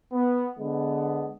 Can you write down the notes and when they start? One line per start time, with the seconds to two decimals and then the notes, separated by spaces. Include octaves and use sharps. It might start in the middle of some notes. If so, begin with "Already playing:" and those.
0.13 B3
0.58 D3 G#3 B3